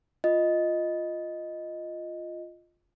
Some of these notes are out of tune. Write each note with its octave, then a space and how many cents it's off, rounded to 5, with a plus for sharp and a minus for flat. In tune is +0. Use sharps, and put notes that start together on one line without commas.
F4 +0 D#5 +0